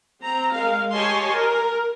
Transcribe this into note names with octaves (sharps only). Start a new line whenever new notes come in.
C4 A#5
G#3 A#4 F5
G4 C#5 D#5 G#5 A5 C6
A#4